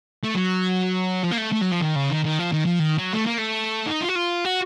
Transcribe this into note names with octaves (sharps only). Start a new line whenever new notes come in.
A3
F#3
F3
A#3
A3
A3
F#3
F3
D#3
C#3
D#3
D#3
F3
D#3
F3
D#3
F#3
A3
A#3
A3
D#4
F4
F#4
F4
F#4